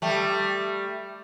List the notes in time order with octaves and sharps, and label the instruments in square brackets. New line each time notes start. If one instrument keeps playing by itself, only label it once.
[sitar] G3 A3